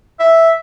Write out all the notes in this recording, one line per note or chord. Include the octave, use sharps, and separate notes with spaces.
E5